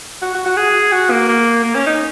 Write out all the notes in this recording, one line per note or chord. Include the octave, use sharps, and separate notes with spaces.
F#4
F#4
F#4
G#4
F#4
A#3
A#3
A#3
C#4
D#4